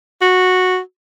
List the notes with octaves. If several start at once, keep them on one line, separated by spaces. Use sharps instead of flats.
F#4